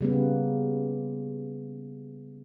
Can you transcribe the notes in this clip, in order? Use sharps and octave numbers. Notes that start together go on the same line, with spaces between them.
C#3 G3 A#3 B3